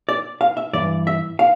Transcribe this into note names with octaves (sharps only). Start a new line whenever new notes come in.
D5
F5
E5
G2 E3 D5
E5
F5